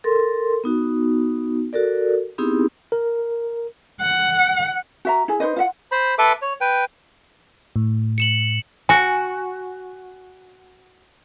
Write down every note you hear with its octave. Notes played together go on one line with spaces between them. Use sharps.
A4 A#4 C6
B3 D#4 F#4
F#4 A4 A#4 D5
B3 C4 D#4 E4 G4 G#4
A#4
F#5
F#4 E5 A#5
E4 G#4
D#4 B4 C5 D#5
F4 E5 F#5
C5 B5
A4 B4 E5 D6
C#5
B4 G5
A2
C#7 E7 F#7
F#4 G#5